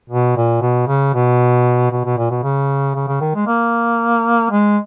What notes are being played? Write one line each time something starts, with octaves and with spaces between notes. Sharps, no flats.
B2
A#2
B2
C#3
B2
B2
B2
A#2
B2
C#3
C#3
C#3
D#3
G#3
A#3
G#3